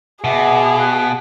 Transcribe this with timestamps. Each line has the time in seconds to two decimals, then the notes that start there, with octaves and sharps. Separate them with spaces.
0.24 B2 G#4 E5 F#5 D6
0.78 F5 F#6